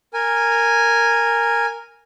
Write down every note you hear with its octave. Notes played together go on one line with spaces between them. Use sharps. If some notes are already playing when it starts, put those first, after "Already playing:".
A#4 G#5